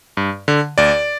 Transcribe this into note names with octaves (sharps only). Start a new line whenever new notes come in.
G2
D3
D2 D5